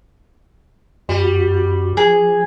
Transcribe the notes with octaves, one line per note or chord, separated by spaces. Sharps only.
F#2 G3 F#4
F3 G#4